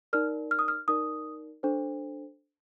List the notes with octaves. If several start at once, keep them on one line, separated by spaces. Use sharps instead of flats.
D#4 A#4 D5 F6
F6
D#6
F6
D#4 A#4 D5 D#6
D4 A4 C5